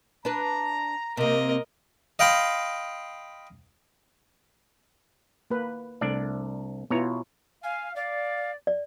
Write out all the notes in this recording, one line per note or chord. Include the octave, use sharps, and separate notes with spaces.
D4 B4 A#5
C3 A#3 A#4 D#5
D#5 F5 G5 B5 C6
A#3 B4
C2 A3 D4 D5
B2 B3 E4 F4 C#5 A#5
F5 G#5
D5 F5
D5